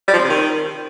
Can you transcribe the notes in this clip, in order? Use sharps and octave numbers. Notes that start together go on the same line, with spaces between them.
G3
F3
C4
C3
D#3